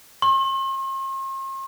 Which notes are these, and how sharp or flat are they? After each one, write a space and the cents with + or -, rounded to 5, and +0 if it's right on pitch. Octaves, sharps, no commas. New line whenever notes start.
C6 +45